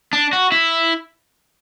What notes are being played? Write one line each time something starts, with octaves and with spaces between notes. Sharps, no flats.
D4
F#4
E4